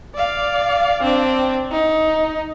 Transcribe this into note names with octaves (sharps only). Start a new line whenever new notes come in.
D5 F5
C4 D4
D#4